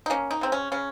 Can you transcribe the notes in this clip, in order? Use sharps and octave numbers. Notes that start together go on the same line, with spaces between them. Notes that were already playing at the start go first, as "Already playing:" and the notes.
D#4
A#3 C#4
D#4
C#3 C4
C#4
C#3 C#4